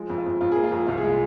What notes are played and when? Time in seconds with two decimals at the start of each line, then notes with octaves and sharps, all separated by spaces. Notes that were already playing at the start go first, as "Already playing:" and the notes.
Already playing: F3 G#3
0.10 F2
0.18 F4
0.26 F2
0.41 F2 F4
0.52 A#3 G#4
0.64 F4
0.72 F2 G#4
0.87 C2 F4
0.97 G#4
1.04 G#3
1.09 F4